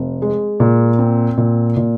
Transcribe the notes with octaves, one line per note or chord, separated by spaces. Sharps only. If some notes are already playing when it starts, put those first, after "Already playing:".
Already playing: F1
G#3
A#2
C4
A#2
A#2